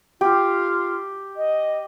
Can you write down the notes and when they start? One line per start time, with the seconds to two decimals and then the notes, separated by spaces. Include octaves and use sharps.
0.21 F4 G4
1.37 D#5